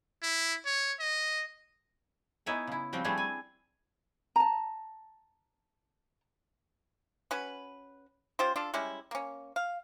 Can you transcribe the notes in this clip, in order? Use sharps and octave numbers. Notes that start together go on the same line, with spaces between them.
E4
C#5
D#5
B3 D#4 E4 C#5 E5 G#5
C#3 E4
F3 G3 C4 F#4 G5
G3 A3 C4 D4 E4 G#4
G#5
A5 A#5
C#4 F#4 B4
C#4 F4 G4 C5
D4 F4 A4
G3 G#3 C#4 E4
A#3 C#4
F5